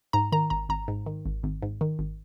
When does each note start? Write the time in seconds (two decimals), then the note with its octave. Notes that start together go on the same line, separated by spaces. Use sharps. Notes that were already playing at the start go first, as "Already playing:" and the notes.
0.13 G#2 A#5
0.32 D#3 A#5
0.50 G#1 A#5
0.69 G#1 A#5
0.88 G#2
1.06 D#3
1.25 G#1
1.43 G#1
1.62 G#2
1.81 D#3
1.99 G#1